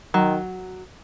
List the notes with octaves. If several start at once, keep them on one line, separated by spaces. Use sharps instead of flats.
D#3 F#3